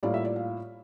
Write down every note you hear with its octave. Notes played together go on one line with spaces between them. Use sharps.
A2 G3 A#3 F4 D5
E5
D5
F5